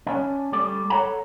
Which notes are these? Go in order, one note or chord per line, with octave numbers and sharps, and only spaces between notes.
C#4 D4
G3 A3 D5
A4 C#5 F#5 A#5